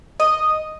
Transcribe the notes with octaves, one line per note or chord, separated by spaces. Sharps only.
D#5